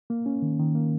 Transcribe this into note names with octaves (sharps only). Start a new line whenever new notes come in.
A#3
C#4
D#3
D#3
A#3